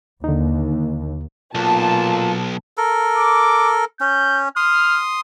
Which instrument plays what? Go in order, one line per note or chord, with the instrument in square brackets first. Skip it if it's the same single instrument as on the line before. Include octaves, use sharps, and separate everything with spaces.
[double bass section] D#2 [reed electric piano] D3 D#4
[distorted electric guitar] B1 [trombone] A#2 [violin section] A5
[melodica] A4 A#4
[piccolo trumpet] D6
[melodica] C#4 [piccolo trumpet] G6
[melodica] C6 D#6 [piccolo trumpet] F6